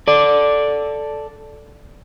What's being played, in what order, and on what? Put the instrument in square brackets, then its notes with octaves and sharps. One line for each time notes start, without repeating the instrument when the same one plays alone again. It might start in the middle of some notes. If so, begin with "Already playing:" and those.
[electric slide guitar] A4 D5